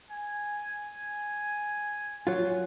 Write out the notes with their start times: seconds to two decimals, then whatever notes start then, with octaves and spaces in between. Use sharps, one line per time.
0.11 G#5
2.27 F#3 F4